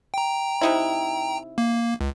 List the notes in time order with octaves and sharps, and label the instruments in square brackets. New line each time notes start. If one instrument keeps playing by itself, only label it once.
[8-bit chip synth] G5 A#5
[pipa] C3 D#4 E4
[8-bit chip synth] A#3
C#2